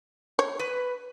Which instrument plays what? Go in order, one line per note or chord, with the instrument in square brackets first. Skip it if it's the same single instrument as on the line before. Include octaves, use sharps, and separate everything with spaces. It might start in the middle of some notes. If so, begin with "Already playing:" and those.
[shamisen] C#5
[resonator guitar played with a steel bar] B4